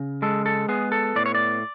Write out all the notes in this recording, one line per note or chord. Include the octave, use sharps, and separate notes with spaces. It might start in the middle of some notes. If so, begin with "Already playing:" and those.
Already playing: C#3
G#3 A4
A4
B3 G#4
A4
A2 D5
C#5
D5